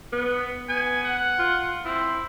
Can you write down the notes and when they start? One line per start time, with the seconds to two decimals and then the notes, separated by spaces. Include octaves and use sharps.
0.12 B3
0.69 B3 G#5
1.04 F#5
1.39 F4
1.85 C4 E4